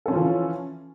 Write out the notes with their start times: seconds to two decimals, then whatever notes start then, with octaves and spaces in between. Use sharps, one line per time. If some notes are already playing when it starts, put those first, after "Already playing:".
0.06 A4
0.08 C#4
0.11 F3
0.13 F4
0.16 E3